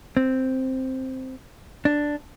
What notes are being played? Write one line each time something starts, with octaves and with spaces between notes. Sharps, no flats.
C4
D4